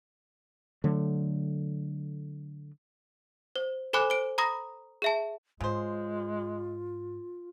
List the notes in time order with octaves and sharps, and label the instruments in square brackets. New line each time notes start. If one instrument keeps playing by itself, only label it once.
[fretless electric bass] D3 F#3 A3
[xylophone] C5
A4 C5 G#5 B5 D6 F#6
C5 D7
A#5 B5 D#6 A#6
G#4 E5 A5
[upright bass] G#2 [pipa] C#3 C5 [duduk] G#3 [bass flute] F4